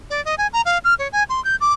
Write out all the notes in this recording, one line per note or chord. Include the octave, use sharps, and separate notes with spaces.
D5
D#5
G#5
A#5
F5
F6
C#5
G#5
C6
G6
D6